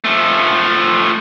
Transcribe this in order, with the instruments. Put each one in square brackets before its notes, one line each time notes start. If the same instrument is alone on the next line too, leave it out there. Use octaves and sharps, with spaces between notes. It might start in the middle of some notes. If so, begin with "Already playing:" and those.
[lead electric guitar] F3 A3